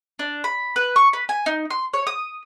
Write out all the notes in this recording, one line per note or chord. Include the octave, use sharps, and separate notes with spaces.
D4
B5
B4
C#6
B4
G#5
D#4
C6
C#5
D#6